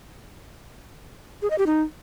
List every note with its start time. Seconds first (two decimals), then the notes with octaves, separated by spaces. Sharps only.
1.42 G#4
1.50 D#5
1.58 G4
1.66 D#4